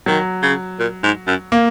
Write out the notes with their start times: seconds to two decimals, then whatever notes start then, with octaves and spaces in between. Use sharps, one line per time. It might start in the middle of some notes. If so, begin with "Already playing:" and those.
0.06 D#3 F#3
0.43 C#3
0.79 A#2
1.03 G#2
1.27 F#2
1.52 A#3